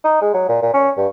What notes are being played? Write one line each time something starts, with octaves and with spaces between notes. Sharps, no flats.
D#4
G#3
F#3
A#2
A#2
C#4
G2